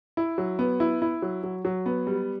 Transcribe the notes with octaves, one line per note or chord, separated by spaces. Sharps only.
E4
F#3
B3
E4
E4
F#3
F#3
F#3
B3
G3